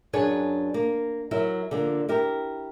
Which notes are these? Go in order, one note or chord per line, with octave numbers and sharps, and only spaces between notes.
F#2 D4 G#4 B4 C#5
A#3
F#3 E4 A#4
D3 F3 A#3
E4 G4 A#4